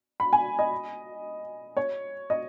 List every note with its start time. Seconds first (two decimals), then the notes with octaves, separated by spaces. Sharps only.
0.20 B5
0.33 G#5
0.59 D#5
1.77 C#5
2.30 D#5